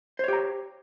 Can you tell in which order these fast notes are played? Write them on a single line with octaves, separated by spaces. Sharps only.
C5 C#5 G4 A#5